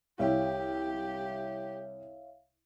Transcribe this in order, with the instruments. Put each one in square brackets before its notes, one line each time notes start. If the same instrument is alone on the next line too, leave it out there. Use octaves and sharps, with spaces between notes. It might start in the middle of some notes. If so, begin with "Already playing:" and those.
[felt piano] C2 [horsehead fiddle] G4 [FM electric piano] C#5 E5 F5